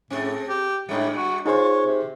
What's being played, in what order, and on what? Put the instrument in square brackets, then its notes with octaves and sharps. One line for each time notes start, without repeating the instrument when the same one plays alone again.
[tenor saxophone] A2 [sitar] C4 G#4 A4
[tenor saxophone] G4
[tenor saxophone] A2 [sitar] G3 D4
[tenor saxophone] F#4
[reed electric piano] D#4 G#4 C5 [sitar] F4 [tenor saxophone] C#5
[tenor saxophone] C3